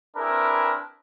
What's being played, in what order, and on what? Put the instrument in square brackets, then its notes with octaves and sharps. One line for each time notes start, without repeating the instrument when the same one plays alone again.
[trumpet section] C4 D4 E4 G#4 A#4 B4